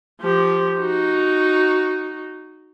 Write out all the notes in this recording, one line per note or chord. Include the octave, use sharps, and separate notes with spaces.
F3 G4
D#4 F#4